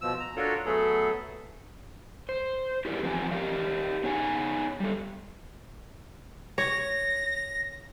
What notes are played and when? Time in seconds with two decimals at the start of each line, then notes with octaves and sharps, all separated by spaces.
0.01 B2 F3 E6
0.20 A#5
0.36 D4 F4 F#4 A4 A#4 C#5
0.65 F#3 A3 B3 G#4 A4
2.29 C5
2.85 E4 G4 G#4 A#4 D5
3.03 E3 F3 C4 F5 G#5
3.31 G4 A#4 D5 F5
4.03 B3 D#4 G#4 C#5 F#5 G#5
4.80 G3 A4
6.58 C#5 A#6